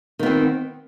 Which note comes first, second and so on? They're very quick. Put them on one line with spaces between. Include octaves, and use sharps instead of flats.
D#3 B3 C4